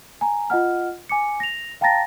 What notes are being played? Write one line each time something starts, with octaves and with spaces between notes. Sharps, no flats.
G#5 A#5
F4 D#5 F#5 F6
G#5 D6 C#7
A#6 F7
F5 G5 A5 A#5 A6 A#6